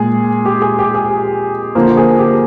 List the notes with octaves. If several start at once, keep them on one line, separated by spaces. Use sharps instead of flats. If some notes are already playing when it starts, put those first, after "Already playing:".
Already playing: A#2 G#3 G#4
G4
G#4
G4
G#4
D3 F3 A#3 C5
G#4
G4